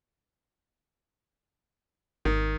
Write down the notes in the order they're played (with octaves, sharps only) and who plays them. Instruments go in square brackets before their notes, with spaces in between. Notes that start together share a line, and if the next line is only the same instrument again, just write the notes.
[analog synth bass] G#1 [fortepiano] D#3